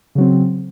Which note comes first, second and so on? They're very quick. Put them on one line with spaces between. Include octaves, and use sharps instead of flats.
C#3 F#3 C4